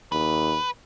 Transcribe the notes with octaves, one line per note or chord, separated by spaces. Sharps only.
D#2 B4